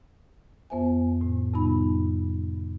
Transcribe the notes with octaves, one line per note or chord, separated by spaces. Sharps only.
F2 B3 C5 E5 G#5
A2
F2 C3 G3 B3 D#4 B5